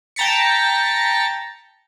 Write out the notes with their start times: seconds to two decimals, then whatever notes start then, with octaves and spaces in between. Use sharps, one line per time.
0.16 G5 A5 A#5 A6 B6 C#7